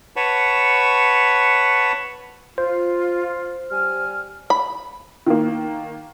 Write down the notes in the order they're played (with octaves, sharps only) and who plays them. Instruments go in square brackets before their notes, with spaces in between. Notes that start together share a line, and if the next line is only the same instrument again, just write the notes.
[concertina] B4 C#5 F#5 A5 B5 C#6
[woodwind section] F4 [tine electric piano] C5
[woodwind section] G3 G#5 F6
[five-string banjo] B5
[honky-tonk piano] D#3 A#3